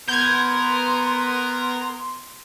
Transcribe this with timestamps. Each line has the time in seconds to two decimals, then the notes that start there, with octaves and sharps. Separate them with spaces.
0.08 B3 A#4 C6 G6 G#6